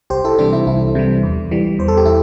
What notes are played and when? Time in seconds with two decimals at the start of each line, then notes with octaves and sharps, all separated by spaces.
0.10 C2 G4 C5
0.24 E4 A4
0.39 C3 E3 G3 D4 G4
0.53 E4
0.67 C2 E4
0.95 C3 E3 G3
1.23 E2
1.51 E3 G3
1.79 E2 C5
1.88 A4
1.97 G4
2.05 E4 A4